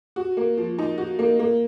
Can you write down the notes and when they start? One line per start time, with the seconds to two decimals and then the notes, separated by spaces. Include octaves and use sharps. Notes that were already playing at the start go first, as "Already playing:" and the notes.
0.16 F#4
0.37 A#3
0.57 F3
0.78 D#4
0.98 F#4
1.19 A#3
1.39 A#3